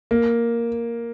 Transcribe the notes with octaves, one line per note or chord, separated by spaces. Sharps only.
A#3